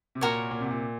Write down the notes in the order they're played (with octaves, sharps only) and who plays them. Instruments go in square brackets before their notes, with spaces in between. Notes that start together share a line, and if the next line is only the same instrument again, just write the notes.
[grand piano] C3
[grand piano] A#2 [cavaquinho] F#4 A#4 C#5
[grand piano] A#2
C3
A#2